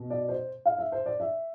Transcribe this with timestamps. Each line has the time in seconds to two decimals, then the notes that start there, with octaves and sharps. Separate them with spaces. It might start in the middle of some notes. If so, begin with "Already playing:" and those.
Already playing: B2
0.10 D5
0.29 C5
0.66 F5
0.78 E5
0.92 C5
1.06 D5
1.20 E5